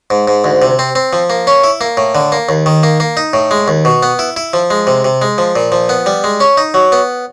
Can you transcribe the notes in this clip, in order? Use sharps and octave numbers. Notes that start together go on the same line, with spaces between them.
G#2
G#2
D2
C3
C4
C4
F3
A#3
C#4
E4
A#3
A2
D3
A#3
D#2
D#3
A#3
A#3
D#4
A2
G#3
D#2
B2
B3
E4
E4
F3
G#3
C3
C3
G#3
F3
A#2
F3
B3
G3
G#3
C#4
D#4
F#3
B3